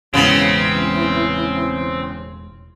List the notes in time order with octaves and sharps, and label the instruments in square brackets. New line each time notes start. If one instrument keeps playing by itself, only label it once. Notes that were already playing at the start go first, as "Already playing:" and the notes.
[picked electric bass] E1 A2 G#3 [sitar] C#3 B3 [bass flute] E3 [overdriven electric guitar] C4